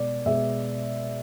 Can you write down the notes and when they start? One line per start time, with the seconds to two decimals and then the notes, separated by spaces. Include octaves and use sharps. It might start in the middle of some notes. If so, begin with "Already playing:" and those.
Already playing: B2 G#3 B3 D5
0.26 B2 G#3 B3 E5